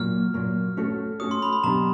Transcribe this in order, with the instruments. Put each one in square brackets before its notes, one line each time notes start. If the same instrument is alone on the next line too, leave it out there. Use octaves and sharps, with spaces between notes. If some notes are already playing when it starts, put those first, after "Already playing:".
Already playing: [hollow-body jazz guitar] A#2 F#3 A#3 [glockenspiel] F6
[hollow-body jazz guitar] A#2 F#3 A#3
A3 C#4 F#4 A4 C#5
[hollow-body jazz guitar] A3 C#4 F#4 A4 C#5 [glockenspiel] D#6
[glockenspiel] C6
B5
B5
[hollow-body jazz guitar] B2 F#3 B3 D4 G4 [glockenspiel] A#5